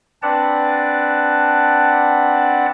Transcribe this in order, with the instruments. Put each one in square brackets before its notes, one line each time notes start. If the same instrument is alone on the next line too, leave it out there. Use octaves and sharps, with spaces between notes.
[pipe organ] C4 D4 B4 D5 F#5 A5